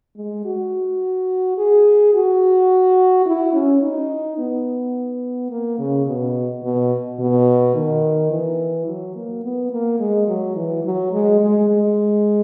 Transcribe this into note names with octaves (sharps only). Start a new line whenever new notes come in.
G#3
F#4
G#4
F#4
E4
C#4
D#4
B3
A#3
C#3
B2
B2
B2
D#3
E3
F#3
A#3
B3
A#3
G#3
F#3
E3
F#3
G#3
G#3
G#3